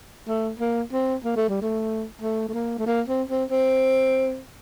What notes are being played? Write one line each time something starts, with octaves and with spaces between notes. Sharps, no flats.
A3
A#3
C4
A#3
A3
G3
A3
A3
A3
A#3
A3
A#3
C4
C4
C4